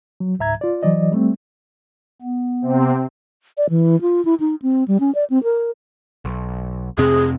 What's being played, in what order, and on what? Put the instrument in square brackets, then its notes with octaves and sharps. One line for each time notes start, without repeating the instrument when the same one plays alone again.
[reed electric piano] F#3
C#2 G#2 E5 A#5 G#6
F4 D5
E3 F#3 D5 D#5
G3 A3 C4
[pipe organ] B3
[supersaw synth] C3 C4
[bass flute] D5
E3
F4
E4
D#4
C4
G3
C#4
D5
C4
A#4
[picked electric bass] B1
[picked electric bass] F2 C3 C4 [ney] G#4